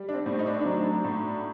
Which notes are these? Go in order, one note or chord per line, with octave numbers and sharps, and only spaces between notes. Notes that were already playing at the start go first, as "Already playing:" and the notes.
Already playing: G3
D4
C4
A2
D#4
D4
C4
F#3 D4
A2